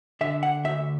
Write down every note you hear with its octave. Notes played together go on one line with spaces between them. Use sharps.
D3 E5
F#5
D2 E5